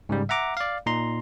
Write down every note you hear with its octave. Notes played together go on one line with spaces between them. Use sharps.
G#2 C#3 G3
E5 F#5 A#5 D6
D5 F5
A#2 D#4 A#5 C6